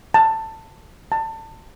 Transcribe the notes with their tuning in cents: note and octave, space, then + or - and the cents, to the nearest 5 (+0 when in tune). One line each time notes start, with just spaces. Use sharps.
A5 +15
A5 +25